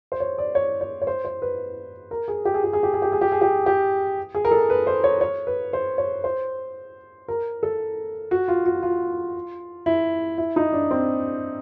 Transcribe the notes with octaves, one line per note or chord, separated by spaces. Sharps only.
C5
C#5
D5
C#5
C#5
C#5
C5
C5
B4
A#4
G#4
G4
G#4
G4
G#4
G4
G#4
G4
G#4
G4
G#4
G4
G4
G#4
A#4
A4
B4
C5
C#5
C#5
B4
C5
C#5
C5
A#4
A4
F#4
F4
F#4
F4
E4
E4
D#4
D4
C4